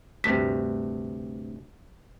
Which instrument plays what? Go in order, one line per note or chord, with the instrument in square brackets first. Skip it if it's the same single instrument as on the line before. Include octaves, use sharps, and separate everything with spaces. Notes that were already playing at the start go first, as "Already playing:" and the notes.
[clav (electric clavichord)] D2 G2 C3 [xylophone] B6